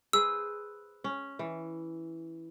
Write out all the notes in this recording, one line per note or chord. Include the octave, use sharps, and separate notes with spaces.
G#4 B4 C5 E6
C#4
E3